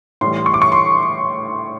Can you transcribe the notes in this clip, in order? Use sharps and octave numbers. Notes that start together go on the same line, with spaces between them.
A2 E3 G3 C6
C#6
D6
C#6
C6